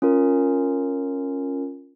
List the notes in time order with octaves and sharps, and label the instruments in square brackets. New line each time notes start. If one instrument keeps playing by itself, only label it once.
[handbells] C#4 F4 A#4